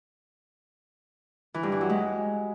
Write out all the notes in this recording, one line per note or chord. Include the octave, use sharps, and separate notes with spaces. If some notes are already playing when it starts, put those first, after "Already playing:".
E3
G2
E3
F#3
G#3